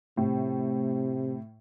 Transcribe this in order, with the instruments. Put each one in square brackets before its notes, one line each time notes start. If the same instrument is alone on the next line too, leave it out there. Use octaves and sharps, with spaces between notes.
[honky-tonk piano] A2 [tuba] C3